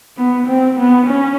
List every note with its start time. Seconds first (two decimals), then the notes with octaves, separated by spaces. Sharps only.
0.17 B3
0.47 C4
0.77 B3
1.07 C#4